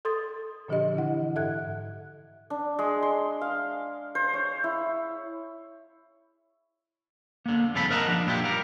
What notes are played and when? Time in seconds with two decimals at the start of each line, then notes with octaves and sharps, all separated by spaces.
0.05 A4 C6 D#6 A6
0.68 A#2 D3 F3 D4 G4 D#5
0.94 D3 E3 E4 F#5
1.35 G#2 A4 E5 F#5 F#6 G#6
2.50 D4
2.79 G#3
3.02 C6
3.41 F5
4.15 C5
4.34 C#5
4.64 E4
7.46 D3 A#3
7.74 C2 F2 C#3 F3 A4 B5
7.90 A#4 D#5 F#5 A5 A#5
8.07 F3 D4
8.27 A#2 E4 F4 G4
8.44 G3 A#4